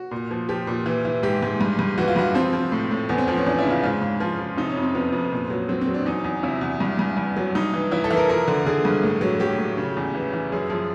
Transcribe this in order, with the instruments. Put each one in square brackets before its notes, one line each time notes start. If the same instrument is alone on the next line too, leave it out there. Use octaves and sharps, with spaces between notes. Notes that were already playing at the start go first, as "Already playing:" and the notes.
Already playing: [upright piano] F#4
A#2
F3
F3 G4
A#2
E3
E3
G#2 G4
G#2
G2
G2
E3 F#4
F4
G2 F#4
F3 C4
F3
A2
A2
E2 B3
C4
F3 B3
C#4
E2 D4
E4
C#3
F4
G#2 F4
G#2
F3
F3
C3 D#4
C#4
F2
C4
F2 B3
F2
A#2
F#3
F#3 C4
C4
F#3
D4
E2 D#4
E2
C3 E4
E2
G2
G2
G2
F#3
G2 D#4
E3
E3 E4
A4
E3
A#4
F3 A#4
D3
D3 G#4
G2
A2
F#3
F#3 G4
A2
C#3
E2
E3
E3
F#2 G#4
F3